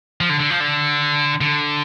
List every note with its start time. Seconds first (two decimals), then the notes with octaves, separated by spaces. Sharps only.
0.21 F3
0.29 D3
0.40 D3
0.50 F3
0.60 D3
1.41 D3